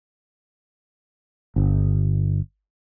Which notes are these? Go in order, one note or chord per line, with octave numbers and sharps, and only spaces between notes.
G1